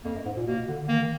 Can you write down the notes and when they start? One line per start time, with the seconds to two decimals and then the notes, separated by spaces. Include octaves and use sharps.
0.04 F2 A#3
0.15 F#2
0.25 G#2
0.37 A#2
0.46 B2 A#3
0.68 D3
0.79 D3
0.88 D#3 A#3
1.02 D#3